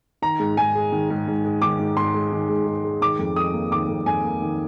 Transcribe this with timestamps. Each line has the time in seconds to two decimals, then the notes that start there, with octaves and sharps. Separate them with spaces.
0.22 D#3 A#5
0.39 G#2
0.57 G#2 G#5
0.75 G#3
0.92 D#3
1.10 G#2
1.27 G#2
1.44 G#3
1.62 D#3 D6
1.80 G#2
1.97 G#2 C6
2.14 G#3
2.32 D#3
2.49 G#2
2.67 G#2
2.84 G#3
3.01 D#3 D6
3.19 F2
3.36 F2 D#6
3.54 A#3
3.72 D#3 D6
3.88 F2
4.06 F2 G#5
4.24 A#3
4.42 D#3